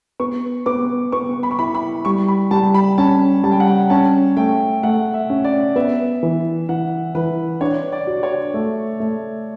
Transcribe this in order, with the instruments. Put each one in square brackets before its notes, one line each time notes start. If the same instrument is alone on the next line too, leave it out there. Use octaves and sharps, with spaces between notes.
[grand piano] B3 [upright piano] C#6
[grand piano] B3 [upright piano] D6
[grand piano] B3 [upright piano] C#6
[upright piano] B5
C#6
[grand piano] E4 [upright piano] B5
[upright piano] B5
[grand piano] G3 [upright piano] C#6
[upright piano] B5
[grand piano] G3 [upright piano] A5
[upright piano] B5
[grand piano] C#4 [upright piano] A5
[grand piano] G3 [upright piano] A5
[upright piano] G5
F#5
G5
[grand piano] C#4 [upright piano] A5
[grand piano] A3 [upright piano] G5
[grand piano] A3 [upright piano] F#5
[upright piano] E5
[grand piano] C#4
[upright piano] D5
[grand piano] B3 [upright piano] E5
[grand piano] E3
[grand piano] E3 [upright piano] F#5
[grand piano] E3 [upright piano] B4
[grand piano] D4 [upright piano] C#5
[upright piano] D5
[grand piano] F#4
[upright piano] C#5
[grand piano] A3
A3